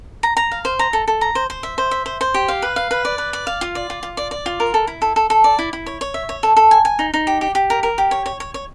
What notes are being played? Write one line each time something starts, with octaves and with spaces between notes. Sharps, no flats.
A#5
A#5
F5
C5
A#5
A4
A4
A#5
C5
C5
E5
C5
E5
C5
C5
G4
F5
B4
F5
B4
D5
B4
D5
F5
F4
D5
F4
F4
D5
D5
F4
A#4
A4
E4
A4
A4
A4
D5
E4
E4
C#5
C#5
E5
C#5
A4
A4
G#5
G#5
D#4
D#4
G4
G4
G4
A#4
A#4
G4
C#5
C#5
C#5
C#5